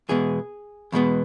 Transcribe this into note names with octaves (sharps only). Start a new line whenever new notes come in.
E2 B2 G#3 B3 G#4
E2 B2 G#3 B3